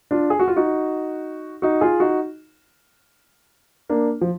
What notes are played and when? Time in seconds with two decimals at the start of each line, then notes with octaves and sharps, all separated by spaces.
0.11 D4 F4
0.30 G#4
0.40 F#4
0.48 F4
0.56 D#4 F#4
1.62 D#4 F#4
1.81 F4 G#4
2.00 D#4 F#4
3.89 A#3 D4
4.21 F3